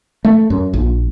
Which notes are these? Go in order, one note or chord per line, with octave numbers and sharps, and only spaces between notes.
A3
F#2
A#1